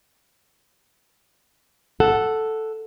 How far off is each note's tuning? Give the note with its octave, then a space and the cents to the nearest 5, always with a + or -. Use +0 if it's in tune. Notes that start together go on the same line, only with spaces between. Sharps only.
A4 +0 F#5 +0